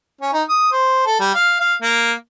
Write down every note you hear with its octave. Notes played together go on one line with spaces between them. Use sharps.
C#4
D#4
D#6
C5
A4
G3
F5
F5
A#3